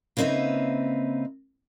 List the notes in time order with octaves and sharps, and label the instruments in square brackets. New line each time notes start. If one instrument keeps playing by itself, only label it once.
[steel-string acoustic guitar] C#3 A#3 C4 D#4 B4 E5